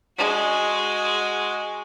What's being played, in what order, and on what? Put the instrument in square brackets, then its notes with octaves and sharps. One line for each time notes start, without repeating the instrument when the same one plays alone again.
[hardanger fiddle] G#3 F#4